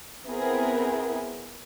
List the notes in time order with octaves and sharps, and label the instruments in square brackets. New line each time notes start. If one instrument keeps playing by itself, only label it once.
[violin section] B3 C4 E4 G#4 A#4